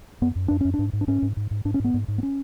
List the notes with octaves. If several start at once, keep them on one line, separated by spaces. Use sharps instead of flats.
F#2 B3
F#2
F#2 D4
F#2 C#4
D4
G#2
G#2
D4
G#2 C#4
G#2
G#2
G#2
G#2 D4
C#4
G#2 B3
G#2
G#2
B3
C#4